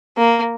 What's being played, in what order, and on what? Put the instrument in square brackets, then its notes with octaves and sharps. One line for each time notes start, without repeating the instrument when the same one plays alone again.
[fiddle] A#3